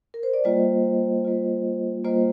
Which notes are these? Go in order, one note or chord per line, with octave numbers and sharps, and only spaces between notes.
A#4
C5
D5
G3 A#3 F4 C5 D#5
G3 A#3 F4
G3 A#3 F4 C5 D#5